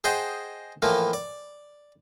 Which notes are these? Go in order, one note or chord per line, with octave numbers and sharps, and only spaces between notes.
G#4 C5 D#5 F#5 G5 A5
A2 E3 F3 A#3
D5